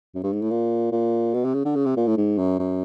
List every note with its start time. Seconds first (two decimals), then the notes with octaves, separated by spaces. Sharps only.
0.15 F#2
0.23 G2
0.32 G#2
0.41 A2
0.51 A#2
0.92 A#2
1.34 B2
1.44 C3
1.54 C#3
1.65 D3
1.76 C#3
1.86 C3
1.96 A#2
2.07 A2
2.17 G#2
2.38 F#2
2.59 F#2